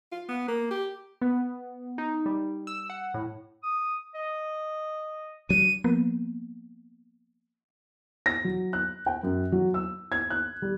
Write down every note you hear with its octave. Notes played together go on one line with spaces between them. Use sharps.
F4
B3
A#3
G4
B3
D#4
G3
E6
F#5
A2
D#6
D#5
D2 F#3 D4 D#7
F3 A#3 B3
A#6
F#3
F#6
G5
F#2
F#3
E6
G#6
F#6
G3